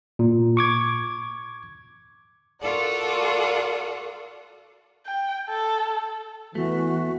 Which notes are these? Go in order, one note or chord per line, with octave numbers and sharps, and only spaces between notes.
A#2
C#6 D6 G#6
F4 F#4 A4 A#4 D5 F#5
G5
A4
E2 E3 A3 F#4